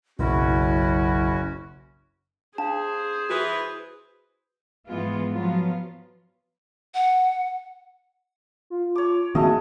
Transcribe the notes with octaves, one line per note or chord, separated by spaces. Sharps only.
F#1 B1 C#4 E4 F#4
D4 G#4 C5 F5 A5
E3 F#4 B4 D#6
G#2 E3 G#3 B3 F4
F3 F#3 B3 F4
F#5
F4
C#5 D6
D#3 A3 A#3 C4 F#4 G#4 D#5